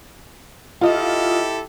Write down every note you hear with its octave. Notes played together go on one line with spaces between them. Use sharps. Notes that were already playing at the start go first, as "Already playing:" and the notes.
E4 F4 G4 A4 D#5